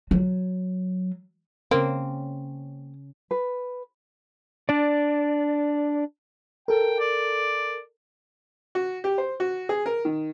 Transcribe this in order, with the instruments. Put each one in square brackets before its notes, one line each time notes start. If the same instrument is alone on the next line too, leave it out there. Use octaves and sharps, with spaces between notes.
[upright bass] F#3
[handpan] C#3 C#4 [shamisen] A#3 C4
[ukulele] B4
[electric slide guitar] D4 D5
[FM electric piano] A4 A#4 [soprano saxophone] G5
[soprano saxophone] D5
[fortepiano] F#4
G4
C5
F#4
G#4
A#4
D#3